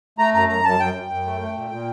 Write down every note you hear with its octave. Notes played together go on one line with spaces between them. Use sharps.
A3 A#5
F#2 A#5
F#2 A#5
F#2 A5
F#2 G5
F#2
F#2
A3
A3
A#2
A#2